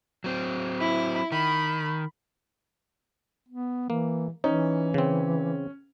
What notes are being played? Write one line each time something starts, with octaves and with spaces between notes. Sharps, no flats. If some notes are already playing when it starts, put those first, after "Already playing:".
F#3 C4
E4 B5
D#3 B5
B3
E3 A#3
E3 C#4 D#4
C#3 C4